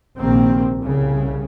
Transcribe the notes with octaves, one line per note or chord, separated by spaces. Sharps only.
A#1 C3 D#3 A#3 C4
C2 C#3